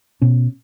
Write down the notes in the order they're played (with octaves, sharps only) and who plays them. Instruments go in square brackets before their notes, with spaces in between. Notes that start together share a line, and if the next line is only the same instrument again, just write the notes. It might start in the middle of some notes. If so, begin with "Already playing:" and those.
[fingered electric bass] B2 C#4